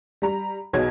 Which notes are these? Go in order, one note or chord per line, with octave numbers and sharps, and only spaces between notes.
G3 A#5
B1 B2 G#4 C#5 G#6